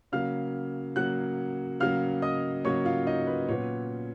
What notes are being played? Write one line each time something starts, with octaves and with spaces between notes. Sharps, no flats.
C#3 F#3 A#3 F5 F6
C#3 F#3 A#3 F#5 F#6
C#3 F#3 A#3 F5 F6
D#5 D#6
C#3 F#3 A#3 C#5 C#6
F4 F5
D#4 D#5
B4
A#2 F#3 B3 C#4 C#5